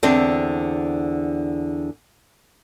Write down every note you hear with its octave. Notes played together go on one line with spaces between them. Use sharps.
E2 D3 C4 D4